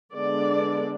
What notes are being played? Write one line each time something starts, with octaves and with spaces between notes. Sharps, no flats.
D3 G#3 B3 D4 D5